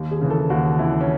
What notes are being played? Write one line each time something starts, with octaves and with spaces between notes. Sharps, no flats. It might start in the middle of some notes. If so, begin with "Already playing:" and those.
Already playing: D#2
G#4
C#3 E3
A4
D#2 F#4
C#3 E3 E4
C#4